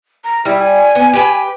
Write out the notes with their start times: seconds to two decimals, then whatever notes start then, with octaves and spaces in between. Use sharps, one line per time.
0.24 A#5
0.45 G3 E4
0.59 G#5
0.95 B3
1.13 G4 B4